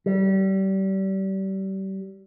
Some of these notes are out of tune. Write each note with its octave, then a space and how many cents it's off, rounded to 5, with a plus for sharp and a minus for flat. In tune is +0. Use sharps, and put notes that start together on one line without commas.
G3 -30